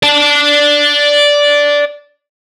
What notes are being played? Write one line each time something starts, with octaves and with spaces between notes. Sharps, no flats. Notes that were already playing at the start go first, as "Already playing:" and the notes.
D5 A5